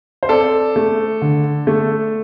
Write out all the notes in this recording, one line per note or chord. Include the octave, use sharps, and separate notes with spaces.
C5
C4 A4 D5
A3
D3
A3